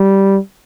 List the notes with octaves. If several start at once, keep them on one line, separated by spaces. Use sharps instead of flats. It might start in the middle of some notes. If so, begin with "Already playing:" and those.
Already playing: G3